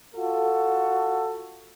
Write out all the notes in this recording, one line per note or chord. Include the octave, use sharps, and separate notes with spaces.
F4 F#4 A4